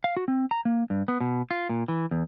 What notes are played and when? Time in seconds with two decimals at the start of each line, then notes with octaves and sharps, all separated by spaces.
0.04 F5
0.17 F#4
0.28 C4
0.51 A#5
0.65 A#3
0.90 G2
1.08 B3
1.21 B2
1.51 F4
1.69 A#2
1.88 E3
2.11 E2